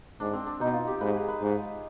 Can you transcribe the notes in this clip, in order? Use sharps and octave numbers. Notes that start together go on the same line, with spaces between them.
G#2 D4
C4
D4
B2 D#4
F4
G4
G#2 B4
G#4
B4
G#2